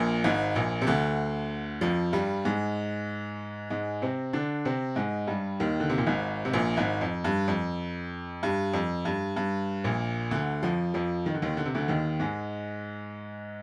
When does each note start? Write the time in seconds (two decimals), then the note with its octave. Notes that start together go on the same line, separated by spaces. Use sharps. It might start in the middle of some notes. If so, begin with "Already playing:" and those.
Already playing: A#1 A#2
0.24 G#1 G#2
0.55 A#1 A#2
0.82 C3
0.87 D2 D3
1.81 F2 F3
2.13 G2 G3
2.45 G#2 G#3
3.70 G#2 G#3
4.02 C3 C4
4.33 D3 D4
4.65 C3 C4
4.96 G#2 G#3
5.27 G2 G3
5.60 D#2 D#3
5.80 D3
5.90 C3
5.98 A#2
6.07 G#1 G#2
6.45 C3
6.53 A#1 A#2
6.77 G#1 G#2
7.01 F2
7.24 G2
7.48 F2
8.43 G2
8.73 F2
9.05 G2
9.36 G2
9.84 A#1 A#2
10.31 D2 D3
10.63 F2 F3
10.94 F2 F3
11.26 D#3
11.34 D3
11.42 D#2 D#3
11.57 D3
11.65 C3
11.75 D2 D3
11.88 D#2 D#3
12.20 G#2 G#3